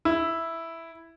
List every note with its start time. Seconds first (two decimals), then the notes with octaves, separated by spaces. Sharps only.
0.05 E4